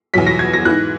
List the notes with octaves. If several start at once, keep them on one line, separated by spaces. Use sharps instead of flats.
E2 B2 F#3 B6
A#6
G#6
A#6
G#2 E3 F#6